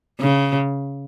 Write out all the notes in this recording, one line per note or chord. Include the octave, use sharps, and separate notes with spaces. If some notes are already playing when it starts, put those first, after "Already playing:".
C#3